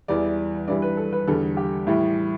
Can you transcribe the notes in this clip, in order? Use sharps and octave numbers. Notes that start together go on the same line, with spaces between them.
E2 E3 G3 D5
G2 E3 G3 D5
B4
A4
B4
E2 D3 G3 A4
G4
A2 E3 G3